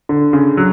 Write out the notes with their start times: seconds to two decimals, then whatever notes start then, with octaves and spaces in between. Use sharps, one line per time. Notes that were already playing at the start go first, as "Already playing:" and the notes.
0.09 D3
0.33 C#3
0.57 F#3